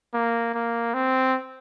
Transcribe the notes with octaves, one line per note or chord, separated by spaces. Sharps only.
A#3
A#3
C4